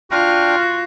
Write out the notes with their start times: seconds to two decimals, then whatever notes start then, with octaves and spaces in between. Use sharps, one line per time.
0.11 D4 F4 F#4 G5 F6